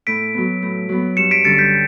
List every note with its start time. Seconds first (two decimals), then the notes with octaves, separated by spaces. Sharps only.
0.07 A2 B6 D7
0.34 F#3 B3
0.62 A2
0.89 F#3 B3
1.17 G2 C#7 E7
1.31 B6 D7
1.44 D3 G3 C#4 A6 C#7
1.58 G6 B6